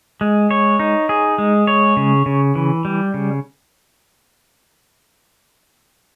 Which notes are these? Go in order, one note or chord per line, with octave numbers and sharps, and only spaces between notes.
G#3
C#5
D#4
G#4
G#3
C#5
C#3
C#3
E3
G3
C#3